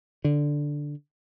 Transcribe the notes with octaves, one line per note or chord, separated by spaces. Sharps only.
D3